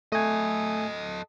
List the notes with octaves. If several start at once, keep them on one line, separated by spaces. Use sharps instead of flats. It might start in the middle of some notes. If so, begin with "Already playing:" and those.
A3 A4 D#5 G#5